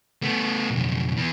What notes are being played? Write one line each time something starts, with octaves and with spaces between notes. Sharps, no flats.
A3 B3
B1 F2
E3 B3